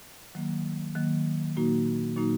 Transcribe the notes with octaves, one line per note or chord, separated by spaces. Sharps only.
D#3 F#3 A#3
D#3 F#3 A#3
A#2 F#3 A#3 D#4 F#4
A#2 F#3 A#3 D#4 F#4